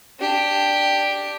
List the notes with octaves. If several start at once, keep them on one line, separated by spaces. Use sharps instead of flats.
D4 G4